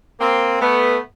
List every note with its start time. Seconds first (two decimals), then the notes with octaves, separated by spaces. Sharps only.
0.20 A#3 C4
0.61 A3 B3